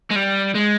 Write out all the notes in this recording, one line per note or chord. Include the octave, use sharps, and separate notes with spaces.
G#3
G3
G#3